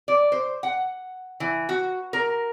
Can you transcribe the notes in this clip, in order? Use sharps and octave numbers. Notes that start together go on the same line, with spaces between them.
D5
C5
F#5
E3
F#4
A#4